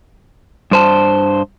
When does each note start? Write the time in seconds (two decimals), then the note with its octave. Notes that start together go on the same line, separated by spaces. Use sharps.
0.71 G2 C5 A5